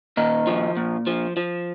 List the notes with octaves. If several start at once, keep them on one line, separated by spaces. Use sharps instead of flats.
A#2 D#3 D#4
F3
A#2
F3
F3